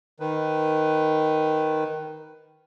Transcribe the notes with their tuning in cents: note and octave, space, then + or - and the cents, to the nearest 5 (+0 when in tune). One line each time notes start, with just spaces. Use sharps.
D#3 +0 B4 +10